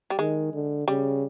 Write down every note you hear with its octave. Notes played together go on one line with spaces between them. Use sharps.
G3
D#3 G#3
D3
C#3 G3